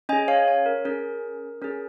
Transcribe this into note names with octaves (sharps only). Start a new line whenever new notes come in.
C#4 G#4 D#5 G#5
C#5 F5
C#5
A#4
C#4 G#4 A#4
C#4 G#4 A#4